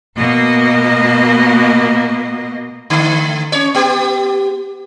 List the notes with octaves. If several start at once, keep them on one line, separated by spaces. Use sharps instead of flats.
B2 A#3 D#5
D3 A3
C#4 C#5
B3 G4